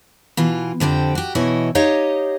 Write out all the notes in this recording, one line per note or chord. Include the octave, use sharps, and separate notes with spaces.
B2 E3 F4
F2 D3 C4 G4
F#4 G4
B2 E3 E4 C#5 D#5
D#4 G4 C#5 D#5 F5